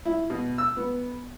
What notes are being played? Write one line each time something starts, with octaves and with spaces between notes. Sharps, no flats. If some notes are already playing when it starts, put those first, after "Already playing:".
E4
B2
E6
B3